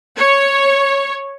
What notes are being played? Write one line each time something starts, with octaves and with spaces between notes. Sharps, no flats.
C#5